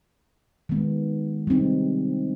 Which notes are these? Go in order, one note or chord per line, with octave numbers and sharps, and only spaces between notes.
D#3 G#3 B3
G3 C4 D#4